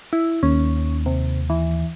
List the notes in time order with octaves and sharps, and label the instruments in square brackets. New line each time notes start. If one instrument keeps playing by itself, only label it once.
[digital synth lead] E4
[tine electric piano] D#2 [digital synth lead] C#4
[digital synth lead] C3
E3